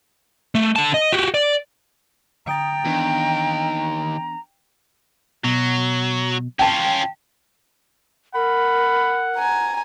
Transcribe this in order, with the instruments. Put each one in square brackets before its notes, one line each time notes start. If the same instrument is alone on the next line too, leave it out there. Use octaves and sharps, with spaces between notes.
[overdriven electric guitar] A3
D3 A5
D#5
F#4 G4
D5
[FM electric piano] D3 D#6 A6 [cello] G5 [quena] A#5
[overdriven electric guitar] D#2 [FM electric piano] E3 B3 D4
[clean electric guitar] B2 [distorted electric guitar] F#3
[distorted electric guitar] C#4 F4 [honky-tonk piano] G5 A5
[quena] A#4 [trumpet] F#5 [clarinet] B5
[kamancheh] G#5 A#5